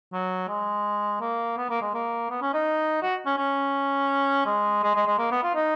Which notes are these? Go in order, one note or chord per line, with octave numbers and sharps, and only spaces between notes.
F#3
G#3
A#3
B3
A#3
G#3
A#3
B3
C#4
D#4
F#4
C#4
C#4
G#3
G#3
G#3
G#3
A#3
B3
F4
D#4